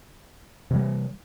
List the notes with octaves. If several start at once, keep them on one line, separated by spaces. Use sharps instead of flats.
C3 E3 G3